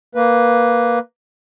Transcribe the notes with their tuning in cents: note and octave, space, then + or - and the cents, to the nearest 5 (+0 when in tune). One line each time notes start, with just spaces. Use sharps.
A#3 +5 B4 +0